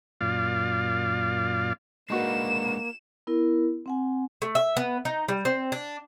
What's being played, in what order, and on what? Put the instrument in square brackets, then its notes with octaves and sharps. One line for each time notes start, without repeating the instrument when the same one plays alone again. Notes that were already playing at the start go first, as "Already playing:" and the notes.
[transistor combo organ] F#2 A#2 F4 D5 F5
[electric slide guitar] G#3 D4 B4 [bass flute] A#3 [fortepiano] D#4 F#4 [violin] E7
[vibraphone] B3 E4 A#4
C4 F#5 G#5
[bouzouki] A3
E5
B3
D#4
G3
C4
D4